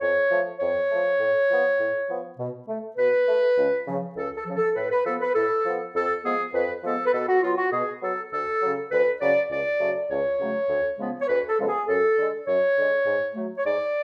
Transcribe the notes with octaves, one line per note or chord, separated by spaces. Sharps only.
F2 C#5
F3 A3
F2 C#5
F3 A3
A2
F3 B3
A2
F3 B3
B2
A3
B2 B4
A3
C#2
C#3 F3
C#2 A4
A4
C#3 F3
A4
A2 B4
B4
F3 B3 A4
B4
A2 A4
F3 B3
F2 A4
F3 G#3 B3 G#4
F2 B4
F3 G#3 B3 A4
B4
B2 A4
F#4
F#3 B3 F4
F#4
B2 G#4
F#3 B3 A4
D2 A4
C#3 F#3
D2 B4
C#3 F#3 D5
C#2 D5
C#3 F#3 A3
C#2 C#5
C#3 F#3 A3
D2
C#3 F3 G#3 B3
C#5
D2 B4
A4
C#3 F3 G#3 B3
G#4
F#2 A4
D3 G#3
F#2 C#5
D3 G#3
G#2
F#3 A3
C#5
G#2 D5